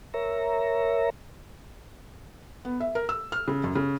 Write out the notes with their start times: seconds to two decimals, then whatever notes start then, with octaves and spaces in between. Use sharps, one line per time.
0.14 A#4 C#5 E5 A#5
2.65 B3
2.80 E5
2.95 A#4
3.09 E6
3.32 F6
3.48 C#3
3.64 F#2
3.75 C#3